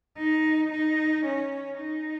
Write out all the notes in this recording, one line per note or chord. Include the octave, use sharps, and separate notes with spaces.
D#4
D#4
C#4
D#4